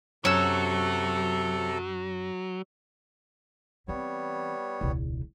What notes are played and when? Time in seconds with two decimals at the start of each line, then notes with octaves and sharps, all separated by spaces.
0.25 F#2 C3 F#3 A4 C#5 E6
3.88 E3 G3 B3 C4 C#5
4.81 E1 C#2